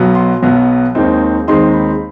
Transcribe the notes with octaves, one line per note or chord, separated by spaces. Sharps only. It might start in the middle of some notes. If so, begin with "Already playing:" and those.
Already playing: B1 B2 F#3 B3
C6
B1 B2 F#3 B3
D#2 D#3 G#3 C4 D#4
D#2 D#3 G#3 C4 D#4 C6
B5